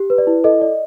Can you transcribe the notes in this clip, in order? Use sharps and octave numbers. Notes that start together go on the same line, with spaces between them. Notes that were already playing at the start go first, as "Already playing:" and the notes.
Already playing: G4
B4
D5
E4
A4 D#5
D5